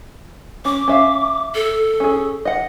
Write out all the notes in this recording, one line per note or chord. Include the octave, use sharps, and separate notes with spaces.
C#4 D6
C#4 E5 F5
A4
C#4 G#4
D#5 F#5